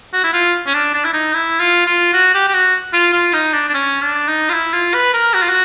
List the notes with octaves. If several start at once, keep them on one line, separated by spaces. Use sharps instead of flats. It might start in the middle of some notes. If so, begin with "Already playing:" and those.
F#4
E4
F4
C#4
D4
D4
E4
D#4
E4
F4
F4
F#4
G4
G4
F#4
F4
F4
D#4
D4
D4
C#4
D4
D#4
F4
E4
F4
B4
A#4
F#4
F4
F#4